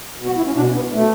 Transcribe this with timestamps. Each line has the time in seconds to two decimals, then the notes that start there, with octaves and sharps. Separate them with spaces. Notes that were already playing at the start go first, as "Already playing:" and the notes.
0.17 B2
0.27 F#4
0.37 E4
0.46 C#4
0.56 B2 D4
0.75 B3
0.93 B2 A3